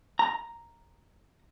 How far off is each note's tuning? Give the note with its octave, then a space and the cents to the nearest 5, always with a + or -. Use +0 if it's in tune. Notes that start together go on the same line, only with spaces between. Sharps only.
A#5 +0